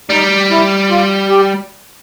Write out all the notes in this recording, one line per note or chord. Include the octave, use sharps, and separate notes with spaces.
G3 D#4
E4
F4
G4